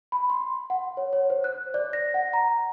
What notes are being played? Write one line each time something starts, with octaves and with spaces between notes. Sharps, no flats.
B5
C6
F#5
C#5
C#5
C5
F#6
D5
A#6
F#5
A#5